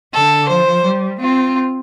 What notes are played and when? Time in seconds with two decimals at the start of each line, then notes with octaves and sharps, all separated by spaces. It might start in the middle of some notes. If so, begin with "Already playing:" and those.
0.14 D3 A4
0.49 F3 C5
0.85 G3
1.20 C4 F4